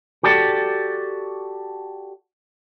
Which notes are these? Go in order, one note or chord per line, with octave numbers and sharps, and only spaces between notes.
F#4 G4 A4 D5